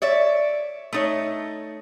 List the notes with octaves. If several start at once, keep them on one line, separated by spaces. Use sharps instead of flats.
C#5 D5 E5
A3 D#4 C#5